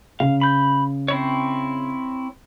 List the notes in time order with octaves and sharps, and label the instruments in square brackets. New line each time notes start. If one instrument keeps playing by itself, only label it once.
[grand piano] C#3 [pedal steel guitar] F5
[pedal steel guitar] B5 G6
C4 E4 C#5